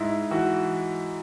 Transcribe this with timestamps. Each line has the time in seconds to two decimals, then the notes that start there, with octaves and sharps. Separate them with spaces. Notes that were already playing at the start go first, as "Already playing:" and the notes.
Already playing: G#2 E4
0.31 E3 F#4